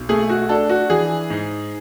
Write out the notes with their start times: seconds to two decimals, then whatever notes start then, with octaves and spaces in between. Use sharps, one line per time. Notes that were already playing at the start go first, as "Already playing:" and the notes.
Already playing: B1
0.09 A3 G#4
0.29 F#4
0.49 D4 A4
0.69 F#4
0.90 E3 G#4
1.30 G#2